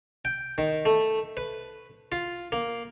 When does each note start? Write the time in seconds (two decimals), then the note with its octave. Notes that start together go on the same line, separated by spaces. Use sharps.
0.25 G5
0.58 D#3
0.85 A3
1.37 B4
2.12 F4
2.52 A#3